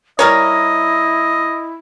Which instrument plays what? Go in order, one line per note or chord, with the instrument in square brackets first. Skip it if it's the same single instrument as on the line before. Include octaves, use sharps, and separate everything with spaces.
[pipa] G3 A#4 C#5 [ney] E4 [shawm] D#5